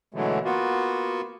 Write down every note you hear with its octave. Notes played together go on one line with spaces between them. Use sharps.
B2 D3 E3 F#3 G#3 A3
A#3 B3 F4 F#4